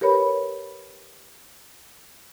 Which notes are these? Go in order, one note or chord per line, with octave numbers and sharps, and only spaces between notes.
G4 A#4 B4 C#5 B5